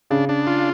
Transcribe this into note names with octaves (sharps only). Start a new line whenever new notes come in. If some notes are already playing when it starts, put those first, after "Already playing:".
C#3 D4
D4
F4